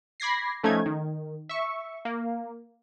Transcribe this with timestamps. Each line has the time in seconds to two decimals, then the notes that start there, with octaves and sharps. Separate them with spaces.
0.20 B5 D6 G#6 A#6 C7
0.63 F3 A3 C#4 D#4 G#6
0.86 D#3
1.49 E5 C#6
2.05 A#3